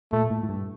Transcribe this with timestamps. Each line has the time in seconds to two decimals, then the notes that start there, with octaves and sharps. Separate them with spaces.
0.12 A#2 A3
0.30 A2
0.43 A2
0.49 G2